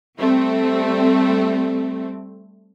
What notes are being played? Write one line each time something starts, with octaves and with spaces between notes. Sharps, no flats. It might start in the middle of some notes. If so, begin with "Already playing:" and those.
G3 A3 C4